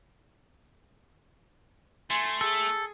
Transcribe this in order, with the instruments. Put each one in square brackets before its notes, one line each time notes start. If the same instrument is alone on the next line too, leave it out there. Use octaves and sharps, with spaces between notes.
[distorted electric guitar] A3 [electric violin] G#5 C6
[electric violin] G#4 [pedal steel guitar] A4